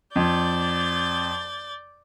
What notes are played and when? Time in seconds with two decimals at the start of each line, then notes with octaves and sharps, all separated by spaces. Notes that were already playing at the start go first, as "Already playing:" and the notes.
0.16 F2 D5 G6 A6